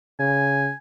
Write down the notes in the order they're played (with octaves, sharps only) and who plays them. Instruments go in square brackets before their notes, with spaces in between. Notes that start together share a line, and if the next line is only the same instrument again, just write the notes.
[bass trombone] C#3 [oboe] G#5